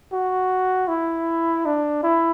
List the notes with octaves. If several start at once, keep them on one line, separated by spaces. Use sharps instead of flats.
F#4
E4
D4
E4